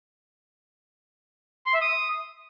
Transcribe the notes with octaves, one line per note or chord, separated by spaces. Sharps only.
C6
E5
D#6